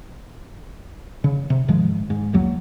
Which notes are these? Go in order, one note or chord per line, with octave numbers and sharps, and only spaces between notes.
C#3
C3
G#2 D#3 F3 G#3
G#2
B1 E2 F#3 A#3